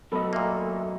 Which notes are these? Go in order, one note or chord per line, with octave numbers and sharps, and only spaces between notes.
F#2 F#3 B3 A4 D#5 B5
A#2 A#3 E5